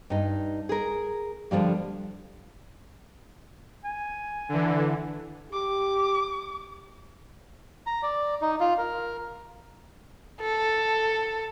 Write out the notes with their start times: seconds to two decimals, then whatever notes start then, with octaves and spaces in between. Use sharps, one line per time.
0.10 G2 D#4
0.69 G#4 A#4
1.51 D3 F3 G3 A#3
3.84 G#5
4.49 D3 E3
5.53 G4 D6
7.86 A#5
8.03 D5
8.42 D#4
8.60 F4
8.78 A#4
10.41 A4